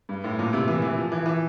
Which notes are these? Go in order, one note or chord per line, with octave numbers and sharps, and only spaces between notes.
G2
A2
A#2
C3
E3
E3
F3
E3
E3